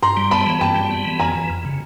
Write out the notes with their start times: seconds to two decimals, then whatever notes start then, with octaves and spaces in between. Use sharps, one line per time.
0.03 G2 A#5 C6
0.17 G3
0.31 B3 A5 B5
0.47 E3
0.61 G2 G5 A5
0.76 G3
0.91 B3
1.05 E3
1.20 F2 G#5 A#5
1.35 E3
1.50 F2
1.65 C#3